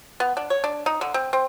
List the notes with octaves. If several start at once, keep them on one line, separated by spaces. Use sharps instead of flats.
B3
D4
C#5
D4
D#4
D3
C4
C4